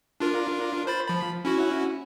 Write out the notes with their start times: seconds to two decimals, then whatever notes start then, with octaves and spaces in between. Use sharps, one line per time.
0.20 D4 F4 A#4
0.87 C5 B5 A6
1.08 F3 B5
1.45 C#4 E4 F#4